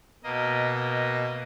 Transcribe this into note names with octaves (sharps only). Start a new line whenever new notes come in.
B2 A#3 D#5
D#5